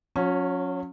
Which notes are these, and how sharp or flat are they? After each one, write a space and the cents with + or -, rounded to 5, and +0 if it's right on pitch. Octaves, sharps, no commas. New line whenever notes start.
F#3 -40 C#4 +0